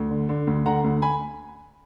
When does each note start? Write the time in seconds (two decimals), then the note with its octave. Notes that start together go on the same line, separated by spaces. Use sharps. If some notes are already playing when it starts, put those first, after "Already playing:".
Already playing: D2
0.11 D3
0.29 D3
0.47 D2
0.65 D3 F#5 A#5
0.84 D2
1.02 G#5 B5